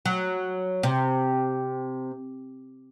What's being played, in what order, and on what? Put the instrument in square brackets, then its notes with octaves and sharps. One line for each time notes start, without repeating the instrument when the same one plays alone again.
[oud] F#3
C3